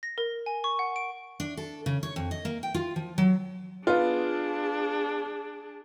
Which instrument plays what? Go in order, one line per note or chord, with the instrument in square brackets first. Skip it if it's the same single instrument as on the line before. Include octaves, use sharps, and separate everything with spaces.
[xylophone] A#6
A#4
G#5
C#6
F#5
D7
[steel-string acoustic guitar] D4
A4
C#3
C#5
F2
D#5
A#3
G5
F4
F3
F#3
[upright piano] B3 F4 [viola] D4 G#4